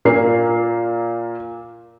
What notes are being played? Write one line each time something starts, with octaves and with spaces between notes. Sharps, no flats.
A#2 A#3 C7